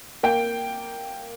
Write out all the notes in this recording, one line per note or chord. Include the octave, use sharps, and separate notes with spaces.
A#3 G5